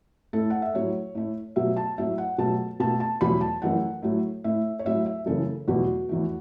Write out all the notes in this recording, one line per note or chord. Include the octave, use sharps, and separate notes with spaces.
A2 A3 A4
F#5
E5
A2 F#3 A3 C#5
A2 A3
B2 F#3 A3 E5
A5
A2 F#3 A3 E5
F#5
B2 F#3 A3 A5
B2 A3 A5
A5
E2 B2 F#3 A3 B5
A5
F#2 E3 A3 F#5
A2 F#3 A3
A2 A3 E5
C#5
A2 F#3 A3 E5
E5
F#2 C#3 E3 A3 A4
E2 B2 F#3 A3 F#4
E2 E3 A3